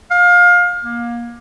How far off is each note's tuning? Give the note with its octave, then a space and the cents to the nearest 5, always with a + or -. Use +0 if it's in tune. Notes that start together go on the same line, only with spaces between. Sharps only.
F5 +25
A#3 +25